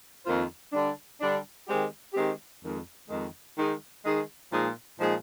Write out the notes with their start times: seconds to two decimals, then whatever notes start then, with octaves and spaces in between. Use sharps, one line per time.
0.25 F2 D#3 A#3 F4 C5
0.73 D3 G3 D4
1.21 D3 G3 D4
1.67 D#3 G#3 C4 G4
2.14 D#3 G#3 C4 G4
2.62 F2 D#3 G#3
3.09 F2 D#3 G#3
3.56 D#3 G#3 D#4 G#4
4.03 D#3 G#3 D#4 G#4
4.50 A#2 F3 G#3 D#4 G#4
4.98 A#2 F3 G#3 D#4 G#4